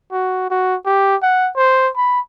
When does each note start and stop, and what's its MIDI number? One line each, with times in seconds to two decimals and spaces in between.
0.12 0.47 66
0.51 0.75 66
0.85 1.16 67
1.22 1.50 78
1.56 1.89 72
1.97 2.20 83